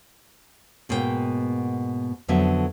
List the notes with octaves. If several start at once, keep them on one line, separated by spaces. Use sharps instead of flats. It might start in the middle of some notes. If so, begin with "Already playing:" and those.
G#2 B2 A#3 A4 G5
F2 D3 F#3 B3 E5